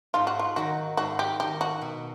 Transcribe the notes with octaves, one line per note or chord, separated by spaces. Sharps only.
G#2 F4
F#4
F4
D#3 F#3 F#4
G#2 F#4
G4
D#3 F#3 G4
F#4
B2